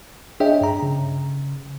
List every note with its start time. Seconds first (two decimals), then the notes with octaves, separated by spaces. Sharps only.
0.40 D4 G#4 C#5 D#5 E5 G5
0.61 G2 A#5
0.83 C#3